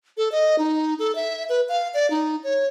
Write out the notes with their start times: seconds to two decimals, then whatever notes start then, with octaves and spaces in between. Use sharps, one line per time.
0.17 A4
0.32 D#5
0.58 D#4
0.99 A4
1.15 E5
1.49 B4
1.69 F5
1.94 D5
2.10 D#4
2.44 C#5